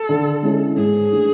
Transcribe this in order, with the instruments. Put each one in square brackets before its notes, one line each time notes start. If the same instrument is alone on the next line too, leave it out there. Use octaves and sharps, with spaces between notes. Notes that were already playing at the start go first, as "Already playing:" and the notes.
Already playing: [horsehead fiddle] A4
[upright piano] D3
G#3 C#4 E4
[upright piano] G#2 [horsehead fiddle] G#4
[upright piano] E3 A3 D4